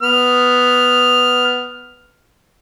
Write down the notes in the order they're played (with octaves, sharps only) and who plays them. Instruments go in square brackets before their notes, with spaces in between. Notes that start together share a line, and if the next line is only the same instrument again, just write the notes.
[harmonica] B3 F6